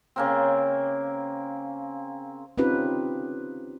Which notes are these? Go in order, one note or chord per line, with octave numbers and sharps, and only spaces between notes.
C#3 A#3 C4
C4 C#4 D#4 F4 G4 B4